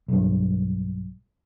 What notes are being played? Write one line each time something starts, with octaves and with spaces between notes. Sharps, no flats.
B1 G2